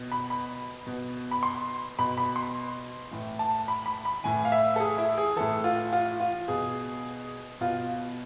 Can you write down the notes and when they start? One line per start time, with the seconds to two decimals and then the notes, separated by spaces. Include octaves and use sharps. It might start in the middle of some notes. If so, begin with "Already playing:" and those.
Already playing: B2
0.12 B5
0.30 B5
0.87 B2
1.31 B5
1.43 C6
1.99 B2 B5
2.18 B5
2.36 C6
3.11 A2 E3
3.39 A5
3.68 B5
3.86 B5
4.05 B5
4.24 A2 E3 G#5
4.45 F5
4.52 E5
4.76 A4
4.80 G#4
4.98 E4
5.18 G#4
5.36 A2 E3 A4
5.64 F4
5.93 F4
6.20 F4
6.48 B2 G#4
7.61 B2 F4